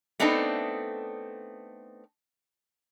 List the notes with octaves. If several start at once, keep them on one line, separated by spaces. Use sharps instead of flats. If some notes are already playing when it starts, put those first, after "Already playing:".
A3 B3 C4 D4 D#4 A4